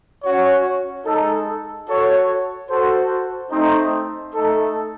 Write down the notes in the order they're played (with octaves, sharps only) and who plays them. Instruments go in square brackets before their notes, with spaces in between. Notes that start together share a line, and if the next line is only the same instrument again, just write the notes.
[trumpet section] C#4 F#4 C#5
G#3 D#4 A4
F#4 A4 C#5
F#4 A4 C5
A3 C4 D#4
A3 D#4 A4